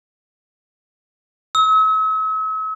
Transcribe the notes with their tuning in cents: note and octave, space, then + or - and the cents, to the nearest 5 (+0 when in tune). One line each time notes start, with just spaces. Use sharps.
E6 -45